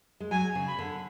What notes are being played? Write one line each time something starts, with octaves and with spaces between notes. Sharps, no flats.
G#3
F#3 G#5
C#3
B5
D3